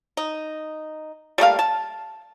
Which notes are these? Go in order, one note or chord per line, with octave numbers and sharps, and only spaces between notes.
D#4
G3 A3 A#3 F5
A5